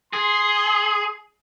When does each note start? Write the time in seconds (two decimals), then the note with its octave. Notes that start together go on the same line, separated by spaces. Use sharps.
0.13 G#4 C6